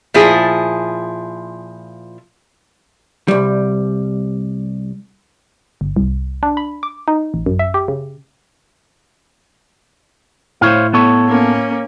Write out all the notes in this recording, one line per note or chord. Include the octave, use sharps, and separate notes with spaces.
A#2 F3 E4 G#4
C2 G3
G1
C2
D4
B5
D6
D#4
A1
F#2
E5
G4
C#3
A2 C5 C#5 F5
B3 A4 C#5
A#3 C#4